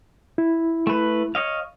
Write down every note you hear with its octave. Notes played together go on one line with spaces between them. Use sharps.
E4
A3 B4
C#5 D#5 F5